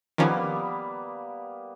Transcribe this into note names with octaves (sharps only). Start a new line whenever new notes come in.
D#3 F3 G3 A#3 B3 C#4